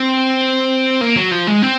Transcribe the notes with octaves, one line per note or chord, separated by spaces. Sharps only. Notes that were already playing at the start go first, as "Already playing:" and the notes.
Already playing: C4
A#3
F#3
F3
G#3
C4